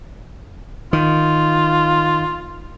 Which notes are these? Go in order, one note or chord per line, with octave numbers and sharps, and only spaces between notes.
D#3 F4